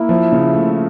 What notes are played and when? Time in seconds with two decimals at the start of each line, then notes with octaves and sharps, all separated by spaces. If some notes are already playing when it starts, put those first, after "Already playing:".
Already playing: A#3 E4
0.09 F3
0.32 C#3
0.53 A3